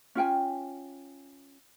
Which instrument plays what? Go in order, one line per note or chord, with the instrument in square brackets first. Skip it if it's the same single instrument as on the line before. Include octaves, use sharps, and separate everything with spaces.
[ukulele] C#4 F4 G5 G#5